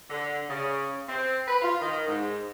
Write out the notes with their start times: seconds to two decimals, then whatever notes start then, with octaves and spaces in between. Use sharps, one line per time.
0.10 D3
0.50 C#3
1.08 C4
1.48 B4
1.61 F4
1.80 D#3
2.08 G#2